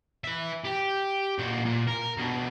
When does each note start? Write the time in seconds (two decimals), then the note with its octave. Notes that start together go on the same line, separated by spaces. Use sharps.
0.24 B4 E5
0.65 G4
1.39 A#2 F#4
1.65 A#2
1.87 A#4
2.17 B2 D3